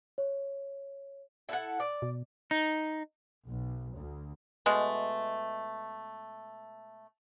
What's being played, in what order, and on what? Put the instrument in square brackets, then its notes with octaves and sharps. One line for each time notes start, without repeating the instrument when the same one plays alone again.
[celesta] C#5
[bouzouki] E4 A4 F#5
D5
[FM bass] B2
[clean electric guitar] D#4
[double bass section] B1
D2
[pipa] B2 G#3 A3